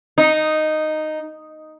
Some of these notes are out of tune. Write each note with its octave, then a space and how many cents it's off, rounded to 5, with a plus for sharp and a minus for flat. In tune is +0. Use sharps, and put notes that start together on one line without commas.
D#4 -5